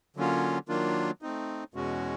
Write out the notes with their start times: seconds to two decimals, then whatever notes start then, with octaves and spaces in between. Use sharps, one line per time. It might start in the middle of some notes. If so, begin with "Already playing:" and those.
0.16 D3 F#3 A#3 C#4 F4
0.69 D#3 F#3 A#3 D4 F4
1.22 A3 C4 D#4
1.74 E2 B2 G#3 C#4 F#4